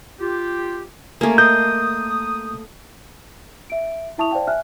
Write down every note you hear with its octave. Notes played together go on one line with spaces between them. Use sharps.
F4 G4
A3 A#3 C#4 G4 G#5
D#5 D#6 G6
E5 D7
E4 E5 A5 C#6 D#6 F7
C5 D5 F5 G5 A5
E5 G#5 F6 F#6